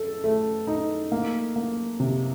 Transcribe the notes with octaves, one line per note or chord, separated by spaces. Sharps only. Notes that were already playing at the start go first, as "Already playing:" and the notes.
Already playing: A4
A3
D#4
A#3
A#3
C3